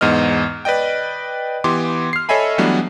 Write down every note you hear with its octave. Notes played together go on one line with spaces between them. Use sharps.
E2 G#2 B3 D#5 F6
B4 D5 D#5 G5
E3 B3 G4 C6 D6
F6 C7
A4 C#5 D#5 E5 G#5 B5
E3 F#3 G3 A3 B3 D4